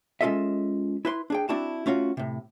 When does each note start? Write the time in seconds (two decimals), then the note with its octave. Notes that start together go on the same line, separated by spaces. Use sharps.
0.21 G#3 C#4 F4 A4 D#5 E5
1.05 E4 B4 C6
1.30 D4 G#4 G5
1.49 C4 D4 E4 F#4 A5
1.86 A3 C#4 F4 F#4
2.17 A2 C3